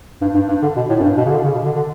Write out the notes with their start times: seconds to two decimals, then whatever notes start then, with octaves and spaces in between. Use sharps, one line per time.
0.21 G2
0.35 G2
0.48 G2
0.62 D3
0.76 B2
0.89 A2
1.00 F#2
1.03 G2
1.17 B2
1.26 C#3
1.31 D3
1.44 C#3
1.55 B2
1.65 D3
1.76 D3